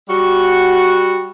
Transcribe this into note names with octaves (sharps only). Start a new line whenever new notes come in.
G3 F#4